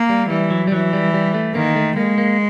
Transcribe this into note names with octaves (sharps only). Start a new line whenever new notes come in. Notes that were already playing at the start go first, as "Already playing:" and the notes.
Already playing: A#3
G3
E3 G3
F#3
G3
E3 F#3
G3
G3
A3
D#3 A#3
A3
G#3 A#3
A#3